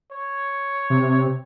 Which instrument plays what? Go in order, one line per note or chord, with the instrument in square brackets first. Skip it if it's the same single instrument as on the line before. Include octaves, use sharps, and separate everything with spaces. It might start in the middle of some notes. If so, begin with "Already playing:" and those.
[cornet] C#5
[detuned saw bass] C3